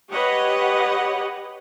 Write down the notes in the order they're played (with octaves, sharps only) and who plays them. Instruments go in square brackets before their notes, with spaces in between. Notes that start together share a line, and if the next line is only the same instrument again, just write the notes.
[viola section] G4 B4 C#5 D#5 F#5